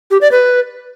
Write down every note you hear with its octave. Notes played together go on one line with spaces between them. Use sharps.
G4
D5
B4